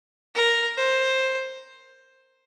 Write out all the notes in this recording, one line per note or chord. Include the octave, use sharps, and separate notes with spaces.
A#4
C5